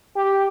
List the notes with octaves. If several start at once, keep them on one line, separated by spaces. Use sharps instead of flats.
G4